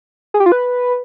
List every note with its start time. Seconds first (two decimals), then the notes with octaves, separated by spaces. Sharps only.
0.34 G#4
0.40 G4
0.46 F4
0.52 B4